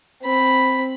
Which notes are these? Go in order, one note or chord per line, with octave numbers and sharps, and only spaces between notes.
C4 B5